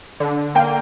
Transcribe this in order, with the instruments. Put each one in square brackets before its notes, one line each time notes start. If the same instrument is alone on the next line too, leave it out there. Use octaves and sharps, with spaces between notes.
[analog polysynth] D3
[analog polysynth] A#3 [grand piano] G5